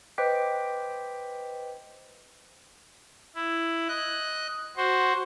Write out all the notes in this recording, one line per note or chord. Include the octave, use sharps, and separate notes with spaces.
B4 C5 D#5 G5 D6 B6
E4
D#5 F#6
F#4 C5